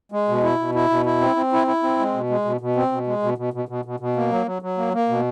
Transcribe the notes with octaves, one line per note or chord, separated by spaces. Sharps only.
G#3
B2
E4
B2
E4
B2
E4
C4
C4
E4
E4
C4
G#3
B2
G#3
B2
B2
C4
B2
G#3
B2
B2
B2
B2
B2
B2
A#3
F#3
F#3
F#3
A#3
A#3
B2